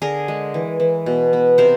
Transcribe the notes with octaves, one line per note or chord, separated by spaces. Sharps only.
D3 G#4 A#4
G#3
E3
E3
B2
B3
C3 A#4 C5